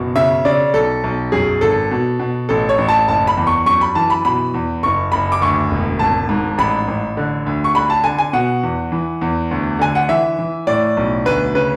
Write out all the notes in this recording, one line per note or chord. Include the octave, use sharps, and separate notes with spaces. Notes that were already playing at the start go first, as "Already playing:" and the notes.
Already playing: F#1 B2
C#3 E5
C#3 D5
B1 A4
B1
F#2 G#4
G#1 A4
B2
B2
A1 A4
C#5
A1
A5
F#1 A5
B5
E2
C#6
F#2 C#6
B5
E3 A5
B5
B2 B5
E2
F#1 C#6
F#1 B5
D6
D2 C#6
E1
G#1 A5
G#2
A1 B5
A1
D3
D2
C#6
D3 B5
A5
D3 G#5
G#5
B2 F#5
E2
E3
E2
D2
D3 G#5
F#5
E3 E5
E3
A2 D5
B1
D2 B4
C#3 B4